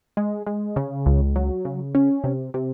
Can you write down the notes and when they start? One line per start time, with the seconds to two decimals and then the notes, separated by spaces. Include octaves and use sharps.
0.17 G#3
0.47 G#3
0.76 C#3
1.06 C#2
1.36 F#3
1.65 C#3
1.95 C#4
2.24 C3
2.54 C3